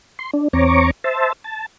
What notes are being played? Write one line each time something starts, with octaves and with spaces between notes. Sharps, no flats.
C6
D4
E2 C4 C#5 A#5 C#6 D6
C5 E5 A5
A5